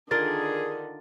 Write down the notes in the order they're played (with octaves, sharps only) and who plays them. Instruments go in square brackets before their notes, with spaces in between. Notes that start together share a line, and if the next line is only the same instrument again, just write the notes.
[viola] D3 D#3 [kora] D4 F4 A#4 [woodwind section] G#4 [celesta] A6